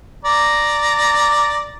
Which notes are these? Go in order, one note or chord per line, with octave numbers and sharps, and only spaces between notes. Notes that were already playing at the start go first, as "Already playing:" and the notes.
D5 A#5